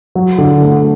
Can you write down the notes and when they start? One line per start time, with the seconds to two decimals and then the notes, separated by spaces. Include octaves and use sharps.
0.15 F#3
0.38 D3
0.62 A3